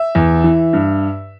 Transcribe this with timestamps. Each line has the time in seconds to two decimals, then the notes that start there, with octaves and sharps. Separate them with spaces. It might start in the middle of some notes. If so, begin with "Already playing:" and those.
Already playing: E5
0.15 E2
0.44 E3
0.73 G2